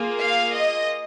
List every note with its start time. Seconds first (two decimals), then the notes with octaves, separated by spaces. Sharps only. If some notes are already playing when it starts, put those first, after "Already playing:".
Already playing: A#3 F4 G#4
0.20 F5
0.53 D#5